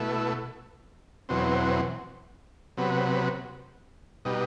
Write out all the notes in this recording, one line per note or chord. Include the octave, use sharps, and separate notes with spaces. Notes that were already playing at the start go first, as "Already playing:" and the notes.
Already playing: B2 A3 E4
E2 B2 F#3 C4
C3 F#3 B3
B2 G3 D#4